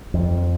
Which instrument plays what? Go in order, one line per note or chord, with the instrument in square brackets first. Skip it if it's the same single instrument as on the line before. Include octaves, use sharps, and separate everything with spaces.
[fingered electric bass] F2